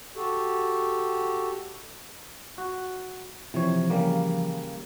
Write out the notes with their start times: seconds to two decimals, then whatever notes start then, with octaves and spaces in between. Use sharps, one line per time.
0.15 F#4 G4 A4
2.58 F#4
3.54 C3 E3 F3 C#5
3.90 C#3 G3 A#3